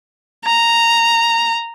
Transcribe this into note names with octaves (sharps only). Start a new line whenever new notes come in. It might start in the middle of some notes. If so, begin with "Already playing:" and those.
A#5